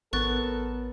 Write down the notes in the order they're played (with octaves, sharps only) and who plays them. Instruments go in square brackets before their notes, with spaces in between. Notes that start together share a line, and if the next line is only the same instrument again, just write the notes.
[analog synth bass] A1 [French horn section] F#3 A4 A#4 [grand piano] B3 [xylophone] C#6 F#6 A6